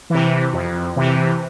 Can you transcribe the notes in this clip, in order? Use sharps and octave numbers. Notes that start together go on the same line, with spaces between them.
C3 E3
F2
C3 E3